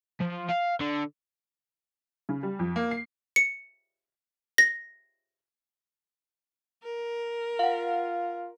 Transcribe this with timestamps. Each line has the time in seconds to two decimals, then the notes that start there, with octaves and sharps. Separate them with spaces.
0.20 F3
0.49 F5
0.80 D3
2.29 C#3
2.43 G3
2.59 F2
2.76 A#3
2.91 C7
3.36 C#7
4.58 A#6
6.84 A#4
7.59 F4 F5 F#5